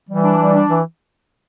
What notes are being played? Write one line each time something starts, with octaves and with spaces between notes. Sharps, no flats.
E3 G3
D4
G3
D4
E3